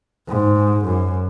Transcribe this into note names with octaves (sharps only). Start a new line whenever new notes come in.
G#2
F#2